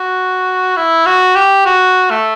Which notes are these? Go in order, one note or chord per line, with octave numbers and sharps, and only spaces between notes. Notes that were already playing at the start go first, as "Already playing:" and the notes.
Already playing: F#4
E4
F#4
G4
F#4
A3